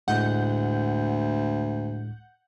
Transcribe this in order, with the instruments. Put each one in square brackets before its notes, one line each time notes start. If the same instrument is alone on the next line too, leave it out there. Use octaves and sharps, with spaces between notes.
[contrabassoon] D2 [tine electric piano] A2 G#3 [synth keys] F#5 G6